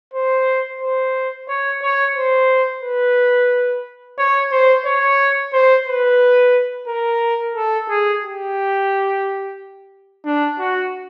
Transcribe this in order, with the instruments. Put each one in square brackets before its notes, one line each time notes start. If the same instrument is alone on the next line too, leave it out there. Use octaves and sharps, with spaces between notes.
[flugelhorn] C5
C5
C#5
C#5
C5
B4
C#5
C5
C#5
C5
B4
A#4
A4
G#4
G4
D4
F#4